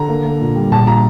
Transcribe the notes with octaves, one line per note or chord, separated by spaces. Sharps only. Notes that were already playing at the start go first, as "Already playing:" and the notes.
Already playing: D3 A#5
A#3
A#3
A#2
G3
A#1 A5
A#2 A#5